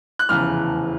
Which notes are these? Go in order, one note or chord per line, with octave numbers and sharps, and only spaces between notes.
F#6
F1 E2 C#3 E3 F6